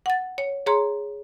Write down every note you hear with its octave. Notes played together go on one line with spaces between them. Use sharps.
F#5 A6
C#5
G#4 C#5 A#5 C6